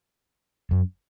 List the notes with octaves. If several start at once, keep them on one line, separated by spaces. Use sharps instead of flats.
F#2